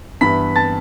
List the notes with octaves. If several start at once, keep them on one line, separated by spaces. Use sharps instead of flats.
G2 E3 B3 E4 B5 B6
A5 A6